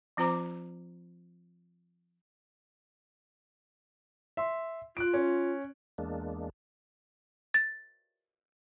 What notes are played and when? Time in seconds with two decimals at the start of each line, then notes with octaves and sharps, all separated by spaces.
0.17 F3 C4 F4 C5 A#5 D6
4.37 E5 C6
4.97 F4 F#6 D7
5.14 C#4
5.98 E2 G#3 A#3 D4
7.54 A6